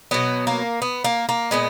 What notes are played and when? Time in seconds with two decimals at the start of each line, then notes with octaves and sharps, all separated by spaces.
0.11 B2 F#3 B3
0.47 A#3
0.82 B3
1.04 A#3
1.29 A#3
1.51 A#2 G#3 B3